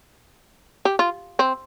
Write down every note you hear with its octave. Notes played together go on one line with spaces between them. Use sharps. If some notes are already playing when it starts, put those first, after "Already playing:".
G4
F4
C4